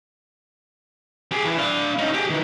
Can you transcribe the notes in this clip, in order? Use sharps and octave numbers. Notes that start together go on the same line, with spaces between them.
G4 G#4
E3
D4 F5
C#4 D#4
G4 G#4
D#3 E3